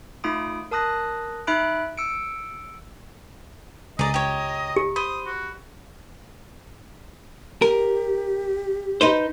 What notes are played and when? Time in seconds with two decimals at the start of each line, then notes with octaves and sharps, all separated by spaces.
0.24 A3 D#4 F4 B5 D#6 D7
0.71 A#4 A5 D#6 F#6 A#6
1.47 D#4 E5 B5 F#6 D7
1.97 E6 C#7 D7
3.99 C#2 G#4 D5 D#5 A#5
4.14 G4 C#5
4.76 G4
4.96 C5 B5 D#6
5.27 F#4
7.62 G4 A#4
9.01 D#4 B4 C5